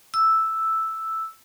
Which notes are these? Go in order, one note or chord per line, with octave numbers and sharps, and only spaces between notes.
E6